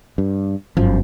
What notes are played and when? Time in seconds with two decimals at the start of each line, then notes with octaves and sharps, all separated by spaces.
0.18 G2
0.77 G1 F#2 F3